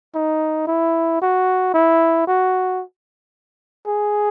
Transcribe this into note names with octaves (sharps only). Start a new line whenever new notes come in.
D#4
E4
F#4
E4
F#4
G#4